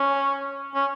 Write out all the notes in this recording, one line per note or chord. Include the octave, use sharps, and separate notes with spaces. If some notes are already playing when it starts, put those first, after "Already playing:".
Already playing: C#4
C#4